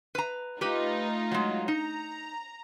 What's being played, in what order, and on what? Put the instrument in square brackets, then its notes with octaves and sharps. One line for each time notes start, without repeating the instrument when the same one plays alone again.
[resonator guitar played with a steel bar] B4 A#5
[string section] A3 D#4 F4 [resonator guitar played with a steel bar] G4 B4
[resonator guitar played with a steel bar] F#3 G#3
[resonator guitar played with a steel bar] D#4 [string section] A#5